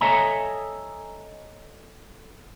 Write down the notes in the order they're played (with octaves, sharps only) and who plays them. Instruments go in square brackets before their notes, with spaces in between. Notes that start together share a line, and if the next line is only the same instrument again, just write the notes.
[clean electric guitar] A4 C#5 D#5 E5 G#5 A#5